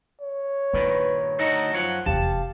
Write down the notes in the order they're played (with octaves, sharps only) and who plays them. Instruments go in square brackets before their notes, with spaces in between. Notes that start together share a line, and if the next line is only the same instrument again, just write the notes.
[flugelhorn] C#5
[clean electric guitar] G2 A#2 D#3 [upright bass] E4 [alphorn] B4
[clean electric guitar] D2 F#4 A4 [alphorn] D#4
[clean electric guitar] F#2 C#5 F#5 [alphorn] F3
[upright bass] F1 E2 [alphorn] G4 [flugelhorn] F5 [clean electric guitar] A5